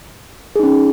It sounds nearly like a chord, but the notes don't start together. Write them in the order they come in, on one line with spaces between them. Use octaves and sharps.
G#4 D#4 C#4